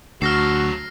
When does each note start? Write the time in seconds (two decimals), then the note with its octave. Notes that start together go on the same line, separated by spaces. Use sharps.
0.22 D2 F#3 F#4 A4 F6 A#6 C7